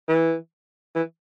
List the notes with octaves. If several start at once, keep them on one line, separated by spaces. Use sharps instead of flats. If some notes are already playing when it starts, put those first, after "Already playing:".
E3
E3